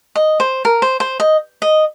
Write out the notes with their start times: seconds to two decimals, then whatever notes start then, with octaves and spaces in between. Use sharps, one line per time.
0.15 D#5
0.40 C5
0.65 A#4
0.82 C5
1.00 C5
1.20 D#5
1.62 D#5